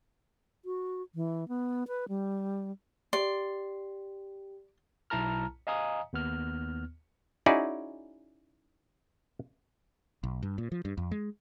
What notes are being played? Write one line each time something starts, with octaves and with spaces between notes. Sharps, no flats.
F#4
E3
B3
B4
G3
G4 D5 G5 C6
B1 E4 A5 A#5 F6
D#5 F5 G#5 A#5 D#6
D#2 B3 F6
C#4 D#4 E4 F#4 G#4 D5
B1
G2
A#2
F3
G2
F2
G#3